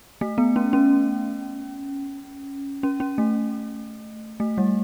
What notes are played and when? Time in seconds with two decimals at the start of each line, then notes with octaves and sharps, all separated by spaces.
0.21 A3
0.38 B3
0.56 C#4
0.73 C#4
2.83 C#4
3.00 C#4
3.18 A3
4.40 A3
4.58 G3